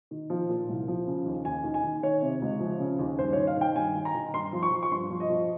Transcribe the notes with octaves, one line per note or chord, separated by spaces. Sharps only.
D#3
F3
A#2
C2
F3
C#3
D#2
D#2 G#5
D#3
G#5
D#3
D#3 C#5
C3
C#2
F3
C#3
D#2
G2 C5
D#3 C#5
F5
D#3 G5
G2 G#5
D#3
A#5
D#3
G2 C6
F3
C#6
F3
C#6
G2 C6
F3
D#5
F3